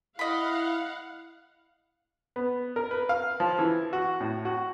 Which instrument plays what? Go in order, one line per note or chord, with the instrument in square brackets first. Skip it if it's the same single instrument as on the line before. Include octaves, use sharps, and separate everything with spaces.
[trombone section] E4 [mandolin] D#5 B5 [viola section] F5 F#5
[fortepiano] B3
A#4
B4
F5
F3
E3
F#4
A2
F#4